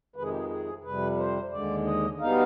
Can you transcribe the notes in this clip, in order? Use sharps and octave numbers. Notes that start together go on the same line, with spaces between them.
F2 C3 D#3 G#3 B4
G#4
G4
G#4
G#4
F2 C3 G3 B4
C5
D#2 D3 G#3 D5
D#5
B2 G3 B3 D#4 F5